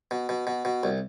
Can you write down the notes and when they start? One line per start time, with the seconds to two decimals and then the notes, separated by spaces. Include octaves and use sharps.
0.11 B2
0.29 B2
0.47 B2
0.65 B2
0.83 C2